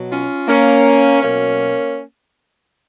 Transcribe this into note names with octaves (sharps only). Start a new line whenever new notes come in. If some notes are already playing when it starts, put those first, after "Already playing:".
Already playing: B2 F#3
C#4 F4
A#3 C#4
B2 F#3 A#3 C#4